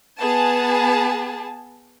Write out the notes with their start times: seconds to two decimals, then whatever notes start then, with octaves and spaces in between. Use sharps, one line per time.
0.19 B3 G#4 A5